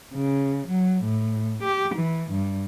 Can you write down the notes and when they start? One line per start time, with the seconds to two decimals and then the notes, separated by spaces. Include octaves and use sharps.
0.14 C#3
0.68 F#3
1.04 A2
1.63 G4
1.95 E3
2.31 G2